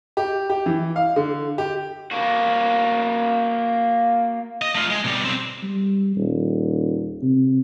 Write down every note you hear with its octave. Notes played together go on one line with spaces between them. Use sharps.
G4
G4
E3
F5
D3
G4
A#3 F#4
D#5
A3 F4
G#3
B2 G3
B1 C4
G3
D#1
C3